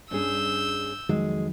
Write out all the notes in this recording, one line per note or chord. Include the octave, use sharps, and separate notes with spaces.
G2 C#4 G#4 E6 G6
F2 D#3 F#3 G#3